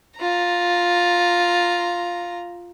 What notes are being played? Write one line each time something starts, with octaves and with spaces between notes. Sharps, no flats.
F4 A#5